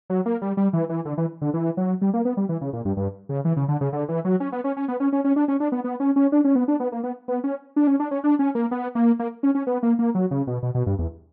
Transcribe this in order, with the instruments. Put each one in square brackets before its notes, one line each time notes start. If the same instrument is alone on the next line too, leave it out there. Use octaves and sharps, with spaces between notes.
[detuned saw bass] F#3
A#3
G3
G3
E3
E3
D3
E3
D3
E3
F#3
G3
A#3
B3
G3
E3
C#3
A#2
G2
G2
C#3
E3
C#3
D3
C#3
D3
E3
F#3
C#4
B3
C#4
C#4
B3
C#4
C#4
C#4
D4
C#4
D4
B3
B3
C#4
C#4
D4
C#4
B3
D4
B3
A#3
B3
B3
C#4
D4
C#4
D4
C#4
D4
C#4
A#3
B3
A#3
A#3
C#4
C#4
B3
A#3
A#3
F#3
C#3
B2
B2
B2
G2
E2